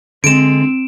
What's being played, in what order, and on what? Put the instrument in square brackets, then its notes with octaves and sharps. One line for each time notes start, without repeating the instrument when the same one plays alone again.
[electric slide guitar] D3 G#3 [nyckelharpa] C4 [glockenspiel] D7 E7